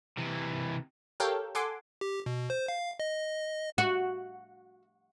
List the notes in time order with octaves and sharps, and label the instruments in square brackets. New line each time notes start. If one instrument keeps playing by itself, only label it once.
[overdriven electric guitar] C3 E3
[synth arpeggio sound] G4 A4 A#4 C#5 F5 G5
A4 F#5 G#5 C6 D6
[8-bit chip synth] G4
B2
C5
F5
D#5
[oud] F#4